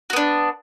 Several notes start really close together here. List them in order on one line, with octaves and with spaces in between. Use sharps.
F#4 B3 D4